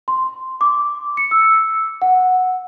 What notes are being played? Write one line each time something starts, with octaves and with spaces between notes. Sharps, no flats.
C6
D6
C#7
E6
F#5